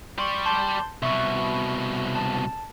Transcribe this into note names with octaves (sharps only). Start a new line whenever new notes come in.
G3 D5 C6 C#6
A5 C6 G6
C2 B2 E5 C#6
A5